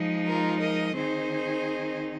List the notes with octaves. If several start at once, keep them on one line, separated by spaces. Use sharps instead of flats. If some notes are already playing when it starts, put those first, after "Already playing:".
Already playing: F3 G#3 D#4
F4 A#4
A#4 D#5
D#3 C4 D#4 G#4 C5